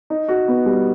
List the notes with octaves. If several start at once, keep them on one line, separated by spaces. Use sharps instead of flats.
D#4
F#4
B3
G3